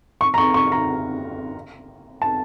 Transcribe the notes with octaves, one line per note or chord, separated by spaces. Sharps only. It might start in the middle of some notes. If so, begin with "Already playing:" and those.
C#6
A#5
C#6
C#6
A#5
A5